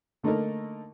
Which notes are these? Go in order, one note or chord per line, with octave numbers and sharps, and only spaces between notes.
D3 A3 A#3 D#4 A4 A#4